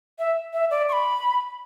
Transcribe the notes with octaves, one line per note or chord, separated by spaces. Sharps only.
E5
E5
D5
C#6
B5